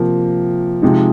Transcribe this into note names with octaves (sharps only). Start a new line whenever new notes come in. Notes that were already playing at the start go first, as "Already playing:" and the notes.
Already playing: C3 F3 A#3
C3 F3 G#3 D#4